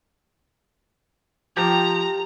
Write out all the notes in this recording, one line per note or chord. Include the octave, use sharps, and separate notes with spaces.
F3 G4 A#5